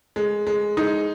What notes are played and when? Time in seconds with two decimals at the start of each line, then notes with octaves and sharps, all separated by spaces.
0.16 G#3
0.47 G#3
0.77 G#3 D#4